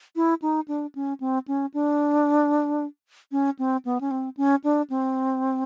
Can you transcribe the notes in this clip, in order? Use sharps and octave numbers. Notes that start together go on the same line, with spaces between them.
E4
D#4
D4
C#4
C4
C#4
D4
C#4
C4
B3
C#4
C4
C#4
D4
C4